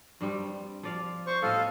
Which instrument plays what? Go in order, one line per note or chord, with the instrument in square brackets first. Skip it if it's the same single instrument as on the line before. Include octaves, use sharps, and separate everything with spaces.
[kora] G2 G3 C4
F3 D5 F5
[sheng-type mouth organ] C5 C#6
[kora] A2 B3 D#5 [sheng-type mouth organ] A4 F5